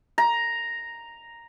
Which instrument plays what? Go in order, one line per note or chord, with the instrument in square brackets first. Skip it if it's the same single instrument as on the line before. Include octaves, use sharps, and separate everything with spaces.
[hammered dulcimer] A#5